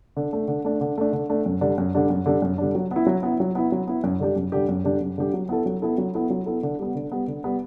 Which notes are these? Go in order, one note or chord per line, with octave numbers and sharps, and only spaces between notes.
D3
A3 D4
D3
A3 D4
D3
A3 D4
D3
A3 D4
F#2
D3 G3 D4
F#2
D3 G3 D4
F#2
D3 G3 D4
F#2
D3 G3 D4
F#3
B3 E4
F#3
B3 E4
F#3
B3 E4
F#3
B3 E4
F#2
D3 G3 D4 G4
F#2
D3 G3 D4 G4
F#2
D3 G3 D4 G4
F#2
D3 G3 D4 G4
F#3
B3 E4 A4
F#3
B3 E4 A4
F#3
B3 E4 A4
F#3
B3 E4 A4
D3
G3 B3
D3
G3 B3
D3
G3 B3